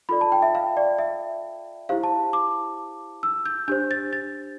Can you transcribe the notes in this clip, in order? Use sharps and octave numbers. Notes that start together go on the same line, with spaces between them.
F4 A4 D5 B5
A5
G5
E5
F5
D5
E5
E4 G4 C5 F5
A5
D6
E6
G6
D4 G4 C5 G6
A6
A6